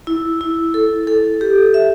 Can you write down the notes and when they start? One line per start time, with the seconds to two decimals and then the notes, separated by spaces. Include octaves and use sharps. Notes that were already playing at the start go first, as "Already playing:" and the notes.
0.07 E4
0.41 E4
0.74 A4
1.07 A4
1.41 G4
1.74 E5